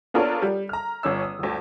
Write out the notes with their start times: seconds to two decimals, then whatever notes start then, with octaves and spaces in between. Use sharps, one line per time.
0.14 B3 D4 F4 A4 A#4 C#5
0.42 G3
0.69 A#5 F6
1.03 G1 C#4 E6
1.22 D#6
1.39 G1 D2